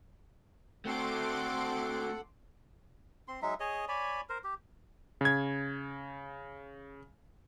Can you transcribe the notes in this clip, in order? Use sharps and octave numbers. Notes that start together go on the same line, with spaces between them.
A3 C4 F#4 A4 F#5 C6 D6
C4 C6
F#3 G#3 D#4 E5
G#4 C#5 D#5
C#5 D5 G#5 B5
A#4 C5
G4
C#3 G#6